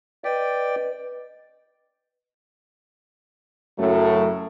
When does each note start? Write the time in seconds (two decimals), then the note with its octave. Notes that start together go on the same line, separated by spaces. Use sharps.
0.24 B4 D5 D#5 G5
3.79 F#2 A2 C#3 F#3 A3